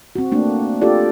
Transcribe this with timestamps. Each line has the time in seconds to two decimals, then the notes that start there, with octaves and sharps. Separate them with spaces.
0.16 C4 F#4
0.32 A3 A#3 D4
0.81 D4 F4 G4 A4 D5